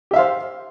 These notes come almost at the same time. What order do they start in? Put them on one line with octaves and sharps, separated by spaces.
G4 E5 F5 C5